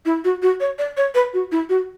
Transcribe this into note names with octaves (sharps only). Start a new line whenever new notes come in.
E4
F#4
F#4
C#5
D5
C#5
B4
F#4
E4
F#4